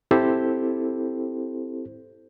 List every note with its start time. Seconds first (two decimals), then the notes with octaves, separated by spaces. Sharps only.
0.11 C4 E4 G4 A4 C5